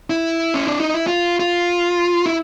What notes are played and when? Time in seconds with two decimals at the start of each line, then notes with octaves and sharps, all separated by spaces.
0.10 E4
0.54 C#4
0.68 D4
0.80 D#4
0.94 E4
1.07 F4
1.40 F4
2.26 E4